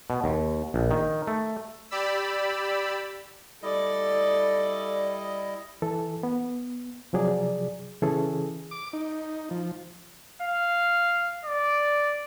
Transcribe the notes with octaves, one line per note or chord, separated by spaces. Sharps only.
B2
D#2
A#1
D#3
A3
G4 D5 B5 E6
G3 E4 A4 D5 D#5
E3 A4
B3
C3 F3 F#3 G#4 D5
C#3 E3 C#4 G#4 A4
D6
D#4
F3
F5
D5